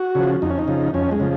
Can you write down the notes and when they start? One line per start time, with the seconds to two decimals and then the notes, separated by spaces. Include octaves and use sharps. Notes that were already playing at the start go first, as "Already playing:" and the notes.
Already playing: F#4
0.15 C#3 F3
0.42 F2 D#4
0.50 C#4
0.59 D#4
0.68 C#3 F3
0.94 F2 C#4
1.11 G#3
1.20 C#3 F3